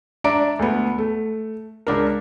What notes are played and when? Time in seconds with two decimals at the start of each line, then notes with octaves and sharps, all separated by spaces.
0.24 D4 D5 E5 A#5 D7
0.59 D2 B3
0.98 A3
1.87 C#2 D4 A#4